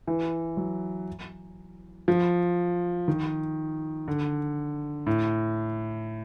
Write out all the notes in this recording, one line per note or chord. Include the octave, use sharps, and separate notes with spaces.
E3
F#3
F3
D#3
D3
A2